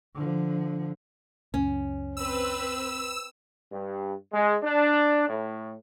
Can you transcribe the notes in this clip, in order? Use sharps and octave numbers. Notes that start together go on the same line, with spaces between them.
D3 F3
C#2 F#2 C#4
C4 B4 E6
G2
G#3
D4
A2